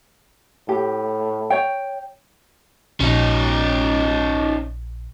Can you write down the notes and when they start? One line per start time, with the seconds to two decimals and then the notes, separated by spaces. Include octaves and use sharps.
0.69 A2 G4
1.50 C#5 G5
3.00 A#1 C#4 D#4